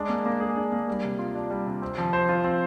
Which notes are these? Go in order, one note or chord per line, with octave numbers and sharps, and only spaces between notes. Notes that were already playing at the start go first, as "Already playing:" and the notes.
Already playing: G#3 D4
A#3
A#3
G#4
D4
A#3
G3
C3
F4
D4
G3
C3
C4
F3
C5
F4
C4